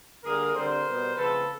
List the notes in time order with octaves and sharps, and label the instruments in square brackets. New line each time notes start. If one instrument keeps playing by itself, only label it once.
[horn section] D3 G3 A#3 G#4 A#4
D3 G3 C4 A#4 C5
B2 G3 B3
C#3 F3 A3 C4 A4 B4